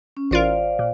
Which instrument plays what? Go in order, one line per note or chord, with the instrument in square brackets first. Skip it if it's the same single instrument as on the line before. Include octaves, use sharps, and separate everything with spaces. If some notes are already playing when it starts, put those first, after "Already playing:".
[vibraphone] C#4
[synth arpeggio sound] A1 F4 A#4 [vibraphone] C5 D5 F5
[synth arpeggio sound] A#2